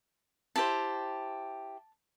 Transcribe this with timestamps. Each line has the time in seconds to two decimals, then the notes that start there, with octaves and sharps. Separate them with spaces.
0.56 E4 G4 C5 A5